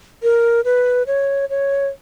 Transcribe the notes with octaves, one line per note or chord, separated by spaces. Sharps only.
A#4
B4
C#5
C#5